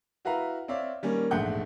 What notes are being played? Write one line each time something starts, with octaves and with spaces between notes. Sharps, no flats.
E4 F#4 B4 F5 A#5
C4 C#5 D5 E5 F5
D#3 G3 A#3 C#4
E1 A#1 G#2 A3 F#5 G6